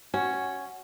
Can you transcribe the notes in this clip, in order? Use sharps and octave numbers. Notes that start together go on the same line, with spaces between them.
C#4 F#4